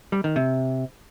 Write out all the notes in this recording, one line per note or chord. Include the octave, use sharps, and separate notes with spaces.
G3
D#3
C3